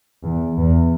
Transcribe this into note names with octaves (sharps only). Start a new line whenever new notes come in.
E2
E2